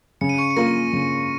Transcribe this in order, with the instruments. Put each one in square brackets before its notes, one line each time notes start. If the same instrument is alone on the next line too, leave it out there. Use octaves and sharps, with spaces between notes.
[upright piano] C#3 [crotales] C#7
[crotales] D#7
C#6 C#7
C#7
[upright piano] A#3 F4 A#4 [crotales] A#6
[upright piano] C#3